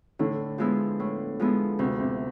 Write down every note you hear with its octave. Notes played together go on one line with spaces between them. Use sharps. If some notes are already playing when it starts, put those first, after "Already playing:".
A2 D3
F3 G#3 B3 E4
A2
F3 G#3 B3 E4
D2 C3
C3